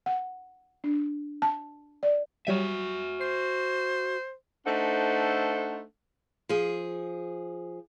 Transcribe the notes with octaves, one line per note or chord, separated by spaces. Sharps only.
F#5
D4
A5
D5
F#3 G3 F#4 E5 D#7
C5 C7
A3 D4 D#4 A4 C5 F#5
F3 G#4